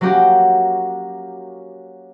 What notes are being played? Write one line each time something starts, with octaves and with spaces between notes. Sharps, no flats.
F#3 A#3 C#4 F#4 G4